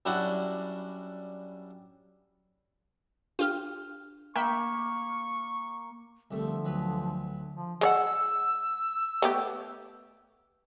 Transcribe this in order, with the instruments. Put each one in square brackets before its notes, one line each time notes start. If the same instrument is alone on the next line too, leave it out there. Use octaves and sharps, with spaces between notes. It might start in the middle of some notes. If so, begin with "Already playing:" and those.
[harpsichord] F#2 G3 D4 E4 F#4 F#5
[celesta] D4 F6 [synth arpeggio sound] F4 G4
[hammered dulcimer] A#3 [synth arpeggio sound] E5 G5 B5 [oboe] C#6
[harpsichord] C2 A3 [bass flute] D3 [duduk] F3
[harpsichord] D2 F#3 B4
[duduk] F3
[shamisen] G#3 C#5 F#5 [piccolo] E6
[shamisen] A3 B3 G4